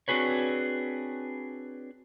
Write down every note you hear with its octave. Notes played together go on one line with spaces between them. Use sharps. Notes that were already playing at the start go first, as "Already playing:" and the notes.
C4 D4 F#4 G#4 B4 C#5